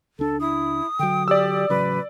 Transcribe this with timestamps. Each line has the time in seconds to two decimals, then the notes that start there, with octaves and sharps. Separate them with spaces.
0.19 C#2 D4 A4
0.41 E4 D#6
0.99 D3 F#3 G5
1.28 G4 D5 E6
1.69 A1 C#3 F#3 B4